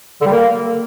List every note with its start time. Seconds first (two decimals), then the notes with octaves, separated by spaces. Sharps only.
0.21 D3
0.26 G3
0.31 A#3